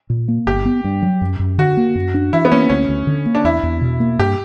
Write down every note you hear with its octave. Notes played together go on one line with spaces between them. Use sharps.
A#2
A#3
G1 G4
B3
G2
F#3
F#2
F#2
D3 F#4
A#3
F#2
D4
E3 E4
B3
A#3 C#4
D2 C#4
D2
D3
A#3
D4
E2 E4
E2
B2
A#3
G2 G4